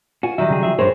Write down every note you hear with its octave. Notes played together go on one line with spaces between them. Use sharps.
F4 F#4 G#5
D#3 F#3 G3 E5
C#3 G#4
F3 G#4 E5
G2 G#4 A#4 C5 C#5